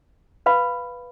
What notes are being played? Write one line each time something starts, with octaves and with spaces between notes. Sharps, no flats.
B4 F5 B5